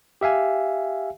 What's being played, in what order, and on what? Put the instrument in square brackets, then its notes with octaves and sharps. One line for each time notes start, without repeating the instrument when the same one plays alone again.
[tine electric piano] G4 E5 F5 G#5